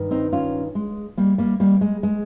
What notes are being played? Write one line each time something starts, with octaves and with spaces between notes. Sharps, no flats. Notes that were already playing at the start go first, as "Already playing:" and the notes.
Already playing: G2 D#3
C4 D#4
C#4 F4
G#3
G3 A#3
G3 A#3
G3 A#3
G#3
G#3